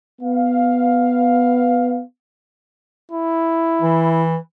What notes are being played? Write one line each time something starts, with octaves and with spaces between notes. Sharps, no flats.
B3 F5
E4
E3